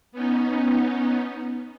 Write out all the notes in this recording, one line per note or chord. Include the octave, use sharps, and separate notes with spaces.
B3 C#4 D#4